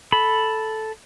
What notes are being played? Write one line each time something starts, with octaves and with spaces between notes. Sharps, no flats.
A4 B5